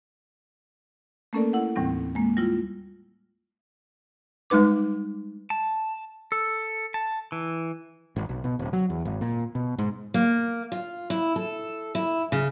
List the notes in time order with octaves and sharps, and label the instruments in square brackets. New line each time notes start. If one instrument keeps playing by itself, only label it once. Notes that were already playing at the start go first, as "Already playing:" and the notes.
[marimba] A3 A#3 C#4 A4 A#4 D5
E4 F#5
D#2 A2 E3 G3 C4
G#3 A#3
G3 E4 F4
[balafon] G3 G#3 D#4 B4 D6
[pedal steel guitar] A5
A4
A5
E3
[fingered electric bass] G#1
B1
B2
D1
F#3
E2
G#1
A#2
B2
G#2
[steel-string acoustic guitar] A#3
F4
E4
A4
E4
C#3